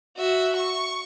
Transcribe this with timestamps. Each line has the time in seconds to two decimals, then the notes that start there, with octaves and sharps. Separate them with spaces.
0.17 F#4 E5
0.56 C#6